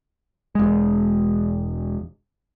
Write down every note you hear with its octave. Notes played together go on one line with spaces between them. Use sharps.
E1 G#3